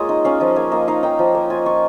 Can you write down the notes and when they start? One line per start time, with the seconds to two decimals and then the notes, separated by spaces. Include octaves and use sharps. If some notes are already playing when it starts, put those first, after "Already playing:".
Already playing: G#3 A#3 F4 C#5 D#5
0.09 D#4
0.25 C#4 F5
0.40 F3 D#5
0.56 A#3 C#5
0.72 A#3 D#5
0.88 D#4 F5
1.03 D#4 G5
1.19 F3
1.35 A#3
1.50 F4 G#5
1.66 F4 C#6